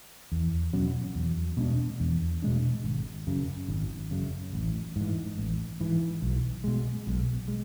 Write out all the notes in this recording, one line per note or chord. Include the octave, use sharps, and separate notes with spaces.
E2
B2 F#3 C#4
E2
B2 G#3 D4
E2
B2 G#3 D4
G#1
F#2 C#3
G#1
F#2 C#3
A1
G#2 E3
A1
G#2 E3
B1
B2 G#3
B1
G#3